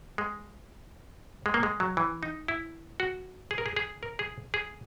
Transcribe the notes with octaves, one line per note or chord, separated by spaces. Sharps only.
G#3
G#3
A#3
G#3
F#3
E3
D#4
E4
F#4
G#4
A#4
G#4
G#4
A#4
G#4
G#4